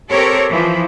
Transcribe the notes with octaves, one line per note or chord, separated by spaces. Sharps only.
C4 G4 A4 A#4 C#5
E3 F3